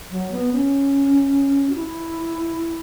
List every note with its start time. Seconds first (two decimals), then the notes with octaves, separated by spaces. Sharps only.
0.11 F#3
0.31 B3
0.52 C#4
1.70 F#4
1.75 E4